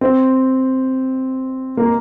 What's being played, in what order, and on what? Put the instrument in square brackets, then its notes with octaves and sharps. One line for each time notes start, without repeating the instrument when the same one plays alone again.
[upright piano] C4
A#3